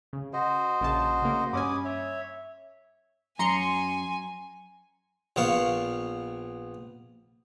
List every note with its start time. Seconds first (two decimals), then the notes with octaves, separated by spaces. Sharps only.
0.13 C#3
0.33 F#4 C5 D#5
0.81 A#1 C#3 A5
1.22 C#3 A#3
1.53 G2 C#4 G#5 B5 D6 D#6
1.85 C#5 E5
3.39 F#2 G#5 A#5 C6 C#7
5.36 A#1 B3 F5 C#6